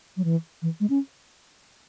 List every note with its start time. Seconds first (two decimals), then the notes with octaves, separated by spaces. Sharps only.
0.17 F#3
0.24 E3
0.62 E3
0.80 G#3
0.90 C#4